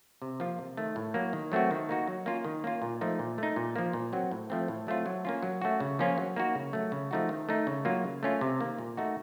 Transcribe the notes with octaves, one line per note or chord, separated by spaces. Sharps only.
C3
F3 A#3 F4
C3
D#3 A3
A2
F#3 A#3
D#3
F#3 A3 C4 F#4
D#3
A#3 D#4 F#4
F#3
A#3 C#4 F4
D#3
A#3 C#4 F4
A#2
F3 A3 D#4
A#2
A3 D#4
A#2
F3 A#3
A#2
F#3 C4 F#4
A2
F3 A3 C4
A2
F#3 A3 C4 F4
F#3
A#3 C#4 F4
F#3
A3 C#4 F#4
C#3
F3 A#3 C#4 F4
F#3
A#3 D#4 F#4
C#3
F#3 A3
C#3
F3 A3 D#4 F#4
D#3
A3 D#4
C#3
F#3 A#3 F4
C#3
A3 C#4 F4
C3
D#3 A#3
A#2
A3 D#4 F#4